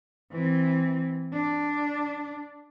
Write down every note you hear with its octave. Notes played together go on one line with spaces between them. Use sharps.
E3 C4
D4